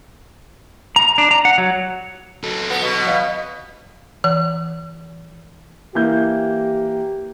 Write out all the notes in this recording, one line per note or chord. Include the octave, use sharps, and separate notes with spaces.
A#5
D4
A#5
F#5
F#3
F#3 A4
B3
B2
D#5 F5 B5
E3
E3 A#3 G4 G6